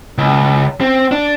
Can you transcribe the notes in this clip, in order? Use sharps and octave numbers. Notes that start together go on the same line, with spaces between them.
C#2
C4
D4